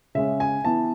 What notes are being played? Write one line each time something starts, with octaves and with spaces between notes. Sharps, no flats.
C#3 G#3 C#4 E5
G#5
E3 B3 A5